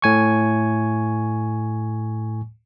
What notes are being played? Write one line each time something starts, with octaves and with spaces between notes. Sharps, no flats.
A2 G#5 C#6